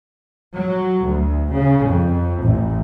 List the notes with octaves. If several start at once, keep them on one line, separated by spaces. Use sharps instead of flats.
F#3
D2
C#3
F2
A1